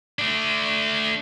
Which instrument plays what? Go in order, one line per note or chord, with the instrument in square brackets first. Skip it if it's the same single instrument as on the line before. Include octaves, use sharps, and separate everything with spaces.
[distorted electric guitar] A3 D4